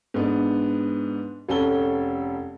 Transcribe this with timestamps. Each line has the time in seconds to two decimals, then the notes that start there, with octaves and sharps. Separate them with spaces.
0.14 G#2 B3 D4
1.49 F1 C#4 A4 G7